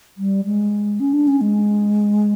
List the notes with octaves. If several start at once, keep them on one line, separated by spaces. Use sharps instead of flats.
G3
G#3
C#4
D4
C#4
G#3